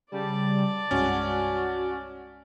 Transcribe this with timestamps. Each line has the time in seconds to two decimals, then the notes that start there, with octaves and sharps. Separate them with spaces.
0.11 C#3 G3 D5 A5
0.91 C2 G2 G#3 C#4 F#4